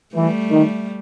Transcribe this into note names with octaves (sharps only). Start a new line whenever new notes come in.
E3 G3 A3
D#3